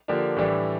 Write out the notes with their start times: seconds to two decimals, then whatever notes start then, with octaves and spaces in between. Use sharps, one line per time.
0.08 D3 F3 A#3 D4 G4
0.37 A2 E3 G3 D4 G4